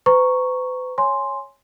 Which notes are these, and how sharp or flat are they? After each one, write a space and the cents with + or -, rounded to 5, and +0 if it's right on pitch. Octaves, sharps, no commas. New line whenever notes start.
B4 +45 A#5 +0 C#6 +0
C#5 +0 G#5 +0 C6 +0